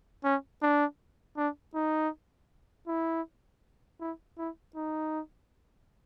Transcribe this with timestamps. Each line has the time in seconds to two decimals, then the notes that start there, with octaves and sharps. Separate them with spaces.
0.24 C#4
0.62 D4
1.37 D4
1.75 D#4
2.87 E4
4.00 E4
4.38 E4
4.75 D#4